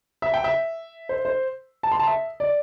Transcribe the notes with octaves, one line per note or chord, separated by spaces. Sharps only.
E5
G5
E5
C5
C5
A5
C6
A5
E5
D5